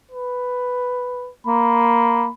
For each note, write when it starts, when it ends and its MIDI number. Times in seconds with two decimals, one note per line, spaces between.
0.12 1.30 71
1.47 2.28 58
1.47 2.31 83